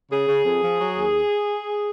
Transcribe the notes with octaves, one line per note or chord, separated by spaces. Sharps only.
C#3 G#4
C#3
F2
F3
F#3
D#2